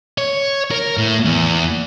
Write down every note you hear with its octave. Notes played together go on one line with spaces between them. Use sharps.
C#5
A#4
A2
E2